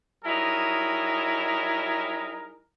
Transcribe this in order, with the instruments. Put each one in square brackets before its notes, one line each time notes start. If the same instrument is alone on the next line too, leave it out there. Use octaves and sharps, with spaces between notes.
[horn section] F#3 G3 D#4 E4 G#4 A#4